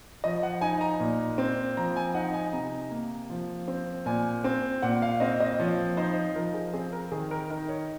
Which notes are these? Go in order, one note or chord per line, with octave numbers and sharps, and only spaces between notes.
F3 D#5
F#5
D#4 G#5
A#5
A#2
C4
F3 A#5
G#5
D#4 F#5
G#5
C3 A#5
A#3
F3
C4
A#2 G#5
C4
A#2 F#5
F5
C4 D#5
D#5
F3 C#5
D#4 C5
F3 A#4
G#4
C4 G#4
A#4
D#3 G#4
A#4
D#4 A#4
C#5